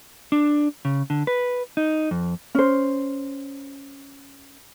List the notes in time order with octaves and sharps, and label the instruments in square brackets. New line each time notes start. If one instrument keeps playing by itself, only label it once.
[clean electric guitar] D4
C#3
D3
B4
D#4
F2
[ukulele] C#4 C5